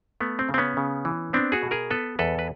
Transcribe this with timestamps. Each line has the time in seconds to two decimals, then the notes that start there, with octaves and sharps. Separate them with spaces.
0.21 A3 B3
0.39 C4
0.49 C#3
0.54 C4
0.58 B3 C#4
0.77 C#3
1.05 E3
1.33 B3 C4 D4
1.52 F#4 G#4
1.63 B2
1.71 G#4 A#4
1.91 B3 A4 B4
2.19 E2 A4 B4
2.39 B4